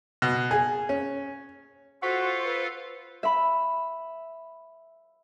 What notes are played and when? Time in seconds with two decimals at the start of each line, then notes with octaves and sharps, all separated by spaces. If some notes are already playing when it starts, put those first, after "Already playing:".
0.22 B2
0.51 G#4
0.89 C#4
2.02 F4 F#4 A4 C5 F5 F#5 C#6 B6
2.44 B4
3.23 E5 B5